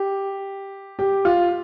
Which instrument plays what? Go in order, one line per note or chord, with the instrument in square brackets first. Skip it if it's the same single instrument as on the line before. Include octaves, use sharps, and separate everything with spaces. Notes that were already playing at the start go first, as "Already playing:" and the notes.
Already playing: [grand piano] G4
G4
F4